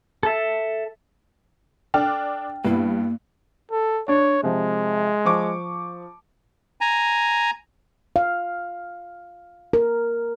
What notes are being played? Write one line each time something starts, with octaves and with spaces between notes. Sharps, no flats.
A4 E5
D4 A4 G5 F6
G2 A#3 B3 E4
A4
D4 C#5
C3 F3 G#3
F3 C#6 D6
G#5 A#5
F5
A#4